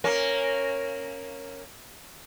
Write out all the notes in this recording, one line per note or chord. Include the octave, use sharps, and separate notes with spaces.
A#3 C#4